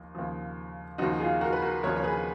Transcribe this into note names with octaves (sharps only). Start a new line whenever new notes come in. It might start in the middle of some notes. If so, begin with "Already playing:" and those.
Already playing: D#2 F3
D#2 C#3 F3
D#2 C#3 F3 D#4 F#4
F4 G#4
F#4 A#4
B4
F#4 A#4
D#2 C#3 F3 A#4 C#5
C#5
G#4 B4